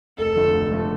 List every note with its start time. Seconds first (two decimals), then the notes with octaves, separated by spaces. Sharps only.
0.18 F1 A4
0.36 F2 D3 A3
0.53 F1
0.71 F2 D3 A3